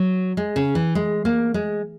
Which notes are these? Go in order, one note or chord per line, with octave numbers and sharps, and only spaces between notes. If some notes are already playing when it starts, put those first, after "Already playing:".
Already playing: F#3
G#3
C#3
E3
G#3
A#3
G#3